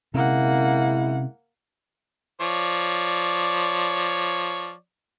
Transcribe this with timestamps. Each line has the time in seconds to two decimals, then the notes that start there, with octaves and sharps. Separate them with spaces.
0.14 F#2 C3 G#3 A#3 C4 C#4 E4 F#5
2.41 F3 C#5 D5